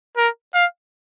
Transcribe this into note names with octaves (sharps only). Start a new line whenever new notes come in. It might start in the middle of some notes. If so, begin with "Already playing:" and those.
A#4
F5